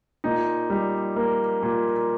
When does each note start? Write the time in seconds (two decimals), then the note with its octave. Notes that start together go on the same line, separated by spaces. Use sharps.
0.24 A#2 D#4
0.70 G3
1.16 A#3
1.63 A#2